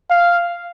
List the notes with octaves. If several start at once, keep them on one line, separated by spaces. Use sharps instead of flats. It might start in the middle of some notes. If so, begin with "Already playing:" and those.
F5